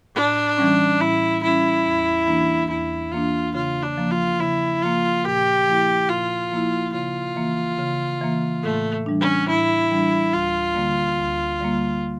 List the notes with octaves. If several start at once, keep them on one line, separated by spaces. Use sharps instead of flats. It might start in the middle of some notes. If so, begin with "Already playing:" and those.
A2 D4
E3 G3 C#4
A2 E4
E3 G3 C#4 E4
E2
E3 A#3 D4
E2 E4
E3 A#3 D4 F4
C#3 F4
D4
F3 A#3
F4
C#3 E4
F3 A#3 F4
A#2 G4
F3 A#3 E4
A#2 F4
F3 A#3 E4
C#3 F4
E3 A#3
C#3
E3 A#3
A2 A3
E3 G3 D4
C#4
A2 E4
E3 G3 D4
D2 F4
D3 G3 A#3
D2
D3 G3 A#3